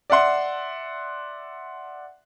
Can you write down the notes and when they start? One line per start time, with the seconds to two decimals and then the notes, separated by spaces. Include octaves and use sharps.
0.10 D5 E5 F#5 C6